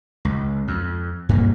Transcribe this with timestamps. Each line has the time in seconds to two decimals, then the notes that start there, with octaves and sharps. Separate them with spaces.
0.25 C#2
0.68 F2
1.29 G2 A3 A#3